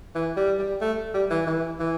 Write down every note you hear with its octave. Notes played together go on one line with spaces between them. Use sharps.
E3
G3
G3
A3
G3
E3
E3
E3